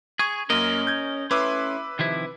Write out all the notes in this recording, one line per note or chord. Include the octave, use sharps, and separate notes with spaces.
G#4 C#6 G#6
F#2 A#3 C#4 A#4 D#5
G6 G#6
A3 C#4 E4 B4 C6 D6 E6
C3 D#3 F3 E4